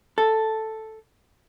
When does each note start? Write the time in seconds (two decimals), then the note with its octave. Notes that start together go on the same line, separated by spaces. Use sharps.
0.18 A4